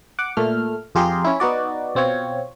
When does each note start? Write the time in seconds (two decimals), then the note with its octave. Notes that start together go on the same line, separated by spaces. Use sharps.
0.19 F#5 D6
0.37 A#2 A3 F6
0.95 F2 F4 G4 G#4 A#5 C6
1.24 C#4 E4
1.40 B3 D#4 F#4 D5
1.95 B2 C4 F4 C#5